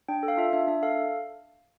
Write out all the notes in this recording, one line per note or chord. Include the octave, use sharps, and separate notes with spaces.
D4 G5
A4
F5
F4 E5
D4 E5
D4 E5
A4 F5